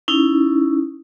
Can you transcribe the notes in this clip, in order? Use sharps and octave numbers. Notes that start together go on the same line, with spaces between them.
C#4 D#4 E4